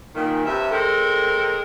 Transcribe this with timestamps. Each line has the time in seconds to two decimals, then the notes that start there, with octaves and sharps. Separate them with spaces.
0.15 A#2 D#3
0.45 G2 C3 E5
0.71 G#3 C4 A4 A#4